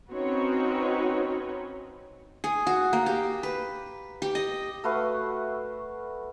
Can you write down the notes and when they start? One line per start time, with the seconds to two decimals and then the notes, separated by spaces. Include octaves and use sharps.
0.13 C4 C#4 D#4 F#4 B4 C#5
2.44 G#4
2.67 F#4
2.93 A#3
3.06 G4
3.43 B4
4.22 G4
4.35 D#5
4.84 A3 F#4 B4 F5